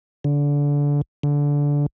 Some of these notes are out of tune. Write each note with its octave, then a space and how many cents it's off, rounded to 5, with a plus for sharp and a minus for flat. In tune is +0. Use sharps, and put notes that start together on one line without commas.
D3 -25
D3 -20